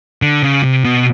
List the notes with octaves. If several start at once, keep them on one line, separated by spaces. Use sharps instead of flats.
D3
C#3
C3
B2